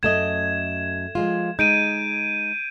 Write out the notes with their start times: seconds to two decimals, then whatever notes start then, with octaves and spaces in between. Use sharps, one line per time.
0.03 F#2 A3 D#5 G#6 E7
1.15 F3 G#3 F4
1.59 G#3 D#4 G6 D7 D#7